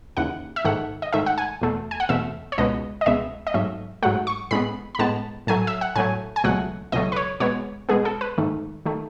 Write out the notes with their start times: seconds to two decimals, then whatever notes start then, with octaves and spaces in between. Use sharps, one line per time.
0.17 D#2 C#3 E3 F#5
0.56 E5
0.65 G#2 D#3 A3 F#5
1.02 D#5
1.13 G#2 D#3 A3 E5
1.26 F#5
1.38 G#5
1.61 E2 B2 A3
1.91 G#5
2.00 F#5
2.09 E2 B2 A3 E5
2.52 C#5
2.58 C#2 B2 G#3 B3 D#5
3.01 D#5
3.06 C#2 B2 G#3 B3 E5
3.47 D#5
3.54 G#2 F#3 A3 E5
4.02 G#2 F#3 A3 F#5
4.27 C#6
4.51 A2 G#3 B3 B5
4.95 B5
4.99 A2 G#3 B3 A5
5.47 A2 F#3 A3 G#5
5.67 E5
5.81 F#5
5.96 A2 F#3 A3 G#5
6.36 G#5
6.44 C#2 B2 F#3 A3 F#5
6.92 C#2 B2 F#3 A3 D#5
7.12 B4
7.16 C#5
7.40 B2 G#3 B3 C#5
7.89 B2 G#3 B3 G#4
8.05 A4
8.21 B4
8.38 G#2 D#3 A3
8.86 D#3 A3